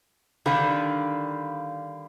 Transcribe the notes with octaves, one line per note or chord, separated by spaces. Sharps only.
D3 D#3 G3 F5 B5